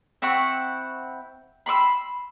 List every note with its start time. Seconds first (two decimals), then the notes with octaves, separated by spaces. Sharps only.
0.22 C4 E4 F#5 C#6
1.66 B5 C6 D6 E6